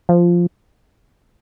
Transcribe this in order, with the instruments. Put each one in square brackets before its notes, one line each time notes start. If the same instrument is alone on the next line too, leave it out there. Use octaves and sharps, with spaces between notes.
[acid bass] F3